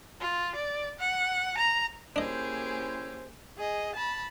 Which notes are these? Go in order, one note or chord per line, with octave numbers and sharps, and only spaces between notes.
F4
D5
F#5
A#5
A#3 C#4 D4 E4 G4 G#4 C5 D#5
G#4 D#5
A5 B5